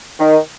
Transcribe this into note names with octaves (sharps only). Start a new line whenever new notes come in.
D#3